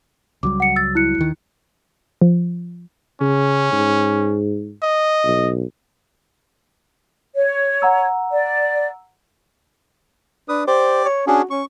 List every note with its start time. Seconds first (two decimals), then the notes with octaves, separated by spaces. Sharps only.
0.43 C#2 F#3 G3 D6
0.60 F#5 C#7
0.76 E6 A6
0.95 E4 F#6 C#7
1.18 D#2 D#3
2.21 F3
3.21 C#3 C#4
3.72 G#2
4.82 D#5
5.24 B1
7.35 C#5
7.82 F#5 A#5 E6
8.32 D5
10.49 D4 B4 D#6
10.67 G4 C5 D5 D6
11.05 C#5
11.27 C#4 D4 F#4 G#4
11.50 C#4 C#6